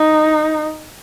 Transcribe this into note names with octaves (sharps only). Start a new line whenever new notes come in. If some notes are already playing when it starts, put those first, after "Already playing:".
Already playing: D#4